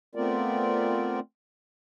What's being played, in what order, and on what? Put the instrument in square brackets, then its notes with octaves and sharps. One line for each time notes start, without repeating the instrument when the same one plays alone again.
[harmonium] A3 B3 C4 F4 A#4 D5